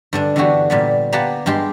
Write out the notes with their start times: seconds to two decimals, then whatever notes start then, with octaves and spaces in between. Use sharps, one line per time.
0.13 G2 D3 D4
0.36 D3 E3 B3 D4 F#4 G4
0.70 A#2 G3 B3
1.12 A#3 B3 G4 B4 F#5 A5
1.46 G2 G#3 G4 A5 C6